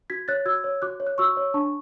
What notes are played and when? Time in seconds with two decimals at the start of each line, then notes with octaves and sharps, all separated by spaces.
0.10 F#4 G#6 B6
0.28 C#5 F#6 A6
0.46 F#4 E6 G#6
0.64 C#5
0.82 F#4 D6 F#6
1.00 C#5
1.07 F#6
1.18 F#4 C#6 E6
1.37 C#5
1.54 D4 A5 C#6